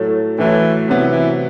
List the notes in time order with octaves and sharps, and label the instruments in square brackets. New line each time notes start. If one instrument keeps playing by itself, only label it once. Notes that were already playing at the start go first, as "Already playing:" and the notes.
Already playing: [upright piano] A2 F#3 A3
[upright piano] A2 F#3 A3 [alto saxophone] E3
[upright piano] C3 F#3 B3 [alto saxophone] E3
[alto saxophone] E3